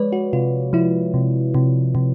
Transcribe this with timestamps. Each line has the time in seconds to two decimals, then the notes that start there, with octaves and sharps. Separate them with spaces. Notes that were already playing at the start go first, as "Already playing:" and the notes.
Already playing: F3 G#3 B4 C#5 D5
0.13 F#4
0.33 C3 F4
0.73 F3 E4
1.14 C3
1.55 C3
1.95 C3